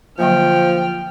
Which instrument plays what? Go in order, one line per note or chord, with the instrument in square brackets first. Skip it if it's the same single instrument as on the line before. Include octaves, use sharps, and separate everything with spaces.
[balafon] D3 F#3 A#3 [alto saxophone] F3 [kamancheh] G5 F6